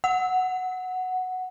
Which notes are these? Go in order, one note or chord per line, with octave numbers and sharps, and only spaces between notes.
F#5